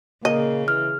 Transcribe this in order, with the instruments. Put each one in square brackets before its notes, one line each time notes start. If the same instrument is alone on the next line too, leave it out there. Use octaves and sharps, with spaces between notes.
[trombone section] A#2 A#3 [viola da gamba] C#3 [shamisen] D#5
[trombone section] E3 [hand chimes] F6